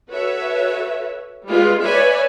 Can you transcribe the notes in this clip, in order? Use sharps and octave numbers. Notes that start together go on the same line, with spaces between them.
F#4 A4 B4 C#5 E5
G3 G#3 F4 B4
B4 C#5 D5 E5 G#5 B5